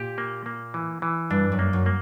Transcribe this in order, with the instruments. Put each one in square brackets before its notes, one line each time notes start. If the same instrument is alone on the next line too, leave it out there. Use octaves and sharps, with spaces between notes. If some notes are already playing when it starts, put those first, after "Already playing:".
Already playing: [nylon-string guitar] A#2 [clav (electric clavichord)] G4
[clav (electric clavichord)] A#3
A#3
E3
E3
[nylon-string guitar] G2 [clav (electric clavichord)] D4
[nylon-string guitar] F#2
[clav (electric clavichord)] A#3
[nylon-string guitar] F#2
[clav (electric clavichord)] A#3